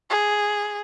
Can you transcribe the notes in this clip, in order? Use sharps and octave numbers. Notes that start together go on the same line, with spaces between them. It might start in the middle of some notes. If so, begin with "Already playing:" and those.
G#4